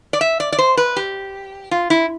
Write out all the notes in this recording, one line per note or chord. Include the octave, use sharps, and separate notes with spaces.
D5
E5
D5
D5
C5
B4
G4
F4
E4